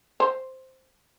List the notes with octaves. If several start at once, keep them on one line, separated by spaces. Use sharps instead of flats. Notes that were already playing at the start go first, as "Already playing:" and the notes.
C5